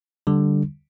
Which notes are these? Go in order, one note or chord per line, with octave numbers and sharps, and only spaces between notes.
D3 G3